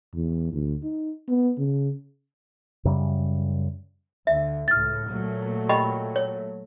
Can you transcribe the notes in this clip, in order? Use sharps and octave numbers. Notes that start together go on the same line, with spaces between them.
E2
D2
D#4
B3
C#3
F#2 C#3 G3
D2 D3 E5
C#2 A2 F6 A6
A#2 F#3 A3
G4 D#5 G5 B5 C#6
C#5